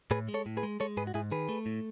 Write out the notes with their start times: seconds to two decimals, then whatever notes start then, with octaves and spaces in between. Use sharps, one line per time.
0.11 A2 G#4 B4
0.28 G#3
0.34 A4 C#5
0.46 A2
0.57 G#4 B4
0.63 G#3
0.80 G#3 A4 C#5
0.97 G#2 G#4 B4
1.07 F#4
1.14 G#2 E4 G#4
1.31 D#3 G#4 B4
1.49 A3
1.66 A2